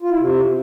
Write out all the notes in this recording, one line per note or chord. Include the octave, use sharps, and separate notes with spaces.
F4
E4
C3